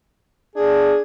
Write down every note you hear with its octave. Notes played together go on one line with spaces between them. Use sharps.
D4 G#4